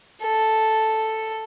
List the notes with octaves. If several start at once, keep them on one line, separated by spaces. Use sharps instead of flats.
A4